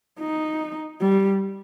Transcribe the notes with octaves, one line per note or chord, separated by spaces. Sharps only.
D#4
G3